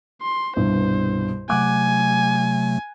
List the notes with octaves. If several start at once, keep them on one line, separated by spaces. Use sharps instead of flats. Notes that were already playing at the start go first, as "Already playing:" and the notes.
C6
C2 G2 B2 C5
C3 F#3 A3 F#5 G#5 D6 F#6